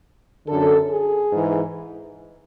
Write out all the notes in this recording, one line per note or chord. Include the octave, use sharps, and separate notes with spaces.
F#2 D3 A4
G#4
G#2 E3